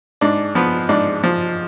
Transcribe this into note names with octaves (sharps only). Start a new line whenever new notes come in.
G#2 D4
F3 B3
G#2 D4
F3